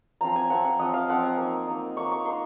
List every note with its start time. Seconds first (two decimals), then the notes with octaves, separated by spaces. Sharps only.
0.21 F3 C4 F4 A#5
0.36 G#5
0.50 F3 C4 F4 F#5
0.65 F#5
0.79 F3 C4 F4 D#5
0.94 F5
1.08 F3 C4 F4 F#5
1.23 G#5
1.37 A#3 D#4
1.67 A#3 D#4
1.96 A#3 D#4 C#6
2.12 C#6
2.25 A#3 D#4 C6